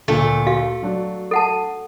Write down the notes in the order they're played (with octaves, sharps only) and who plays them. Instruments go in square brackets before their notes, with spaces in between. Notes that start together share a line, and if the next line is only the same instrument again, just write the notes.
[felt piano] D2 A#2 [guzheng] A3
[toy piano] F#4 F5
[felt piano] F#3 D4
[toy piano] A4 F#5 A5